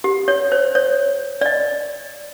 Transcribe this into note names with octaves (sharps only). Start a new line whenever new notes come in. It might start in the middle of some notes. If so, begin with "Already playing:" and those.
G4
C#5
C5
C#5
D5
D#5